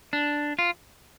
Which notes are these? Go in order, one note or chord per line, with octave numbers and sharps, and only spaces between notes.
D4
F4